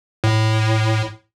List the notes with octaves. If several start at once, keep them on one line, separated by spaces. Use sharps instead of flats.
A2